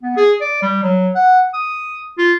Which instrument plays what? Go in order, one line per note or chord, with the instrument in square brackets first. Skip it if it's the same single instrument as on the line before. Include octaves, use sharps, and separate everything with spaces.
[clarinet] B3
G#4
D5
G3
F#3
F#5
D#6
F4